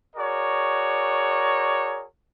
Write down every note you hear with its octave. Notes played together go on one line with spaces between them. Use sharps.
F#4 G#4 A#4 C#5 D5